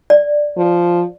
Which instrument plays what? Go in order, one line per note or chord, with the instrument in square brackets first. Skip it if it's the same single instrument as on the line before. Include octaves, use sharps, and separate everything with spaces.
[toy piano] D5
[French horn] F3